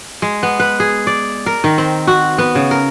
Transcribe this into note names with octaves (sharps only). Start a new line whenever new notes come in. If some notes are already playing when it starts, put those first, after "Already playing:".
G#3
B3
B4
G#4
D5
A#4
D#3
C4
F#4
B3
C#3
A#4